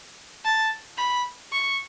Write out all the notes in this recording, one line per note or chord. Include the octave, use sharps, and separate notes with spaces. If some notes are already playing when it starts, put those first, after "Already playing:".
A5
B5
C#6